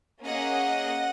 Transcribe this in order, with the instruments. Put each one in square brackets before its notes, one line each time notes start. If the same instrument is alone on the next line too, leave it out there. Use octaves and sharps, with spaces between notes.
[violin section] A#3 C#4 G#4 D#5 F#5